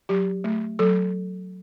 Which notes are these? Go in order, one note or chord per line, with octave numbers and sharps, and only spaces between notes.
F#3 G4
A3
F#3 A4